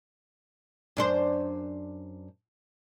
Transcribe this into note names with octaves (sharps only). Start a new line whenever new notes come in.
F#2 D4 C5